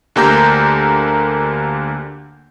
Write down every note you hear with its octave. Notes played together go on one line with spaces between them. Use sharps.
D2 D3 A#3 G4 A#5 G6